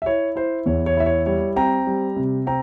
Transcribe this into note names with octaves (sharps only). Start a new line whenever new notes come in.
E5
E4 C#5
E4 C5
E2 C#5
C#5
E4 E5
C#5
G3 C#5
C4 G5 A#5
G3
C3
C4 G5 A#5